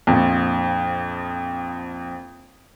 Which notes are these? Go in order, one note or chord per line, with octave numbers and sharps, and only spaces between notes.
A#1 F2